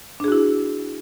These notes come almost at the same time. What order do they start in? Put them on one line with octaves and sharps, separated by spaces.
D4 G#4 F#4 E4